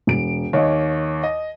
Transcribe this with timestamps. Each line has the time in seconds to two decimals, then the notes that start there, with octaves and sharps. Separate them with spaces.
0.07 E1 D7
0.53 D#2 C#5 D#5 F5
1.23 D#5